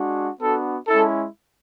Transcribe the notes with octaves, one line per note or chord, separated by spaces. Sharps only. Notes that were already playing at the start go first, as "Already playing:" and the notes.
Already playing: G#3 D4 F#4
B3 D4 F#4 A4
G#3 C#4 E4 A4